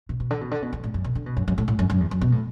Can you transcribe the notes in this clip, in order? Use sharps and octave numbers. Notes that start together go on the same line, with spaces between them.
B2
B2
D3
B2
D3
B2
E2
A2
F#2
B2
D3
B2
F#2
F#2
A2
A2
F#2
F#2
E2
F#2
B2
A2